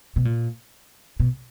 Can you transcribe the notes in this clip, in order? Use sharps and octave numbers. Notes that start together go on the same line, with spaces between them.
B2
A#2
B2